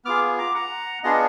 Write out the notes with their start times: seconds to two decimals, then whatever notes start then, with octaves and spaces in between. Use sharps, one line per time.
0.05 B3 F4 G#4 D6 F6
0.38 A#5 D6
0.54 F#5 A#5
1.04 B3 D4 F4 G#4 D#5 F#5